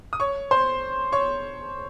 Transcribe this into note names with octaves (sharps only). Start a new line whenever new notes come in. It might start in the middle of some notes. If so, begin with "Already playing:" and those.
D#6
C#5 C#6
C5 C6
C#5 C#6